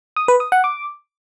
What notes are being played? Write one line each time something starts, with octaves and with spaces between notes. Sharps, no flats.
D#6
B4
D#6
F#5
D6